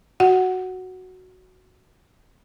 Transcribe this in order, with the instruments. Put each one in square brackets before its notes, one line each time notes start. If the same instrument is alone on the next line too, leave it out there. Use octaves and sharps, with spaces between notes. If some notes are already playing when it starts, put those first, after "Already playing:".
[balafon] F#4 F#5